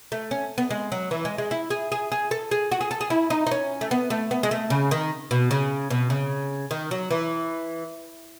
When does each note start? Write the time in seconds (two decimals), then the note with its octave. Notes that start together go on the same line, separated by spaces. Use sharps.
0.12 A3
0.31 C#4
0.58 B3
0.71 G#3
0.92 F#3
1.11 E3
1.25 G#3
1.38 G#3
1.51 E4
1.70 G#4
1.92 G#4
2.12 G#4
2.31 A4
2.51 G#4
2.72 F#4
2.81 G#4
2.91 A4
3.01 G#4
3.10 E4
3.30 D#4
3.47 D#4
3.51 C#4
3.81 A3
3.91 B3
4.10 A3
4.31 B3
4.43 G#3
4.51 A3
4.70 C#3
4.91 D#3
5.31 B2
5.51 C#3
5.90 B2
6.10 C#3
6.71 D#3
6.91 F#3
7.11 E3